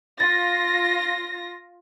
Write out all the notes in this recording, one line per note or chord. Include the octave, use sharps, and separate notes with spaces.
F4 A6 A#6